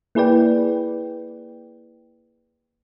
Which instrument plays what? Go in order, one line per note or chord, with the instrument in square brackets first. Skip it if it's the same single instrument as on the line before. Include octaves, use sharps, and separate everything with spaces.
[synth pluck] A#3 E4 G#4 B4 D5 G5